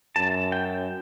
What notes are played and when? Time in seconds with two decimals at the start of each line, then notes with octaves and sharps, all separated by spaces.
0.16 F#2 A5
0.52 G5